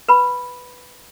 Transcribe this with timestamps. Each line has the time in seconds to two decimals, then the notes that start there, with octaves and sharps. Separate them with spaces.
0.08 B4 B5